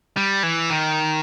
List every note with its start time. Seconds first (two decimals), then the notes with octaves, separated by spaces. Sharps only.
0.17 G3
0.43 E3
0.70 D#3